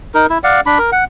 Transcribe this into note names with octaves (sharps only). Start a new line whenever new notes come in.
D#4 A#4
E4
D5 F5 F#5
D4 B5
A#4
F#5